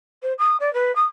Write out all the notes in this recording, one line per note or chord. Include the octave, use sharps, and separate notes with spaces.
C5
D#6
D5
B4
D#6